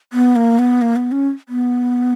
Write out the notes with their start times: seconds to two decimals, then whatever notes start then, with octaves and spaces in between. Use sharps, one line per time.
0.13 B3
0.36 A#3
0.59 B3
0.82 A#3
0.96 B3
1.12 C#4
1.49 B3